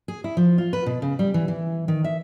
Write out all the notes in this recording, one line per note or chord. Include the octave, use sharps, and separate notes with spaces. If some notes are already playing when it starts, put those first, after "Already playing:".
G#4
E4
F3
F4
B4
B2
C#3
G3
E3
E3
D#3
E5